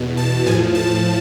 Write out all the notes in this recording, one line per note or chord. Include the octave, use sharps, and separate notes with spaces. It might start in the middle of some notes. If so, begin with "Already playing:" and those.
Already playing: E2 B2
A5
A2 F3 G#5
A5